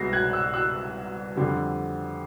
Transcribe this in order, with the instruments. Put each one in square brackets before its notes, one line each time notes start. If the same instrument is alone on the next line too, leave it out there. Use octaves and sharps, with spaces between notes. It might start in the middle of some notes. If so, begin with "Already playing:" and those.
Already playing: [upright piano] C2 B2 G#3 B3 A#6 C7
F#6 G#6
E6 F#6
E6 F#6
F2 D3 G3